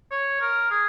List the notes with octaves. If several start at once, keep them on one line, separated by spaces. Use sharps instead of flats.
C#5
A#4
G#4